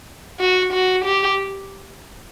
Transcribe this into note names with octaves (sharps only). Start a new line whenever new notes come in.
F#4
F#4
G4